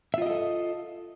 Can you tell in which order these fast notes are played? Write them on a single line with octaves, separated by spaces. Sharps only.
E5 F4 D#5 G4 A4